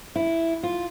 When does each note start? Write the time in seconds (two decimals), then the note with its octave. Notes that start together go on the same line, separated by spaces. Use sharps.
0.16 E4
0.63 F4